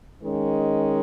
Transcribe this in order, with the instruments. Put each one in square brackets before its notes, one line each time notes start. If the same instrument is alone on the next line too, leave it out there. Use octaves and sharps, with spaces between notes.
[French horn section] D#3 G#3 C#4